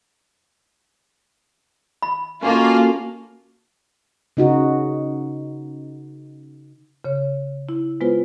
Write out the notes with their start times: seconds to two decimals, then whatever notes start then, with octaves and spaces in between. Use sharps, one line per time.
2.02 B5
2.42 A#3 C#4 F4 F#4 A4
4.37 C#3 D#4 F#4
7.04 C#3 C#5
7.69 E4
8.01 G#3 B3 F4 B4 C5